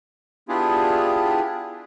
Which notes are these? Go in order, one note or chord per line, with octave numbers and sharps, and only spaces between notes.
B3 D4 E4 F4 G4 G#4